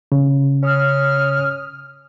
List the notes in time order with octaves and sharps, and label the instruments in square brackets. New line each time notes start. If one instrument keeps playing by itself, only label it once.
[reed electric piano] C#3
[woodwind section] C#4 D#6 F6